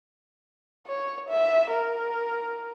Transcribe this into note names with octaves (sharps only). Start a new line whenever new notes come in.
C#5
E5
A#4